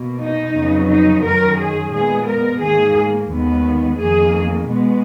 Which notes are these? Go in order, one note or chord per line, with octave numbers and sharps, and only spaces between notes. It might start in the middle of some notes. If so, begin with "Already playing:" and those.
Already playing: B2 A#3
D#4
F2 C#3 F#3 B3
D#4
F#2 D#3 F#3 A#4
G#4
A#2 G#3 B3 G#4
A#4
G#2 D#3 A#3 G#4
D#2 D#3 G#3 B3
F2 D#3 A#3 G#4
B2 G#3 B3